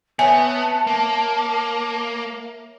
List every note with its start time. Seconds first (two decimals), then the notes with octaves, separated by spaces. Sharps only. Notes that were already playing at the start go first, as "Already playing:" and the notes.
0.19 B3 C#5 E5 G#5 A5
0.87 A#3